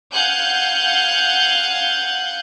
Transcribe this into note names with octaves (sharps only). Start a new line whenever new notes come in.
F5 F#5 G#5 F#6 G6